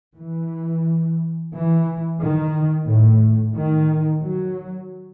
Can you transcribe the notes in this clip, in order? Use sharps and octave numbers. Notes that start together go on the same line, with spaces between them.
E3
E3
D#3
A2
D#3
F#3